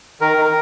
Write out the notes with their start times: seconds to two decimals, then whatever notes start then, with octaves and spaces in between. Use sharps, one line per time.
0.21 D#3 A#4
0.37 D#3
0.45 A#4